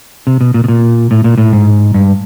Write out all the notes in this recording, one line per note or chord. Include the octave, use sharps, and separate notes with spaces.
C3
B2
A#2
B2
A#2
A2
A#2
A2
G#2
G2